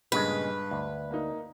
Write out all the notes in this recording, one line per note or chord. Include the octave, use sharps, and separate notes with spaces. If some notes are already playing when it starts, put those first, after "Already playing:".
G2 A#2 C#3 G#3 B4
D2
A#3 D#4